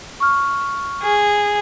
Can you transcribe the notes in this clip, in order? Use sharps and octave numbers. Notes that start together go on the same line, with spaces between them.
C#6 F6
G#4